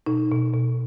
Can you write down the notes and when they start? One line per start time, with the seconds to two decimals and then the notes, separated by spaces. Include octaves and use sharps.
0.06 B2 D#4
0.31 B2
0.54 B2